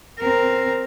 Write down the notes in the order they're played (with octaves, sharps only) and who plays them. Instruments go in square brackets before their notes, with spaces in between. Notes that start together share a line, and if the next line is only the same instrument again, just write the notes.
[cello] C4 A#4